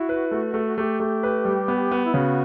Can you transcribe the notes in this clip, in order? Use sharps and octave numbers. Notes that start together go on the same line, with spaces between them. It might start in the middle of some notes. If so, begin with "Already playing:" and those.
Already playing: E4 F#4
B4
A3
A3
A3 G4
A3
B4
G3
B3
B3
E4
C#3 F#4